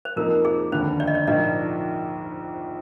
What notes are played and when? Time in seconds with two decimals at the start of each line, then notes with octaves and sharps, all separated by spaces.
0.05 C5
0.16 F2 C3 F3 A#3 D#4 A#4
0.45 G#4
0.72 F1 D#2 D3 C5
1.00 D5
1.07 D#5
1.15 D5
1.27 A#1 G#2 F3 A#3 D4 D#5